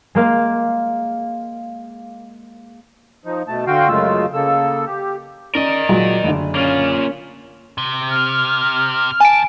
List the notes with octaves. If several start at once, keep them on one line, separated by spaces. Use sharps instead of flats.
G#3 A#3 F5
F3 D#4
B2 A3 A5
D3 F#4 F5 G5 C6
F#2 C#3 G#3 A3 F4 E6
C#3 A#3 A4 E6
G4
C#4 A#4 D5 D#5
A#2 F#3 G#3
F#1 D3
A#3 C#4 F4
C3
F6
D2 G#5 A5 D7